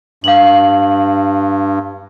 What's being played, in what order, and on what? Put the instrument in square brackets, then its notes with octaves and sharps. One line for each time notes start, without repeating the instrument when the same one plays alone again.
[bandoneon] G2 [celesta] F5 F#7